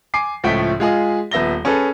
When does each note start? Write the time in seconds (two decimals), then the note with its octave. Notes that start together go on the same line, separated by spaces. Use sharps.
0.14 G#5 D6 C7
0.44 C#2 A2 F3 A3 G5 B6
0.80 G#3 F4 G#4 D#5
1.31 D#1 B3 E5 A#6 G7
1.65 C#4 G#4 A4 B4